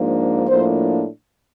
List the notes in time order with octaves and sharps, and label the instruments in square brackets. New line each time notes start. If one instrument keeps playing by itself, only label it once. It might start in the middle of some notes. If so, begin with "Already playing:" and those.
Already playing: [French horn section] G#2 F3 A#3 D4
A2 F3 A#3 D4 C5